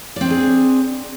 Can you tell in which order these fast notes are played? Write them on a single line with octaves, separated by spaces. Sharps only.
D5 C4 D4 G#4